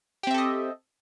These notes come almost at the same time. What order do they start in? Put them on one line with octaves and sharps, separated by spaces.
G4 C4 E5 A4 D#5